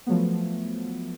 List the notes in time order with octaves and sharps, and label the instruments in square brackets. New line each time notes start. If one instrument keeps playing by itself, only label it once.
[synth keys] F3 F#3 A3 B3